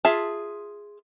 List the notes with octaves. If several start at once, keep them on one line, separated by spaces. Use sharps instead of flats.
F4 G#4 E5 A5